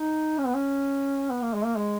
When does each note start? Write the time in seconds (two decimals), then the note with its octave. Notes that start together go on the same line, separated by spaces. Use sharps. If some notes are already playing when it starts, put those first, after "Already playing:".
Already playing: D#4
0.38 C#4
0.47 B3
0.55 C#4
1.31 B3
1.42 A#3
1.54 G#3
1.65 A#3
1.77 G#3